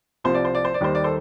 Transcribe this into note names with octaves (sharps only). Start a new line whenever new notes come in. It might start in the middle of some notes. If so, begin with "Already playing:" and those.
C2 C3 F3 C5
D5
C5
D5
C5
D5
D#2 D#3 G3 C5
D5
A4 C5